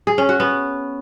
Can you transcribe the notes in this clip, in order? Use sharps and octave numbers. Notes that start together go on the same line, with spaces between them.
G#4
C#4
F#4
B3